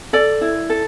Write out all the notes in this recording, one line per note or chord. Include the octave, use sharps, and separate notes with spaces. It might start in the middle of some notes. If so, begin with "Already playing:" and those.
A4 D5
E4
A4